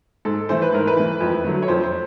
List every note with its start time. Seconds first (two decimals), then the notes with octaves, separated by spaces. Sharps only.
0.25 G#2 A4
0.49 E3 A3 C5
0.62 B4
0.72 G#2 A#4
0.87 B4
0.96 E3 A3
1.21 F2
1.44 D3 F#3 A3
1.63 C#5
1.68 F2 C5
1.84 C5